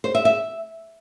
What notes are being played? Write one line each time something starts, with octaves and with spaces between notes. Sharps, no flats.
C5
E5
E5